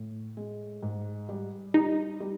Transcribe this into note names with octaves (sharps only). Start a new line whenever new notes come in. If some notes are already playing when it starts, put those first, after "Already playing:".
Already playing: A2
G#3
G#2
G3
G3 D#4
G3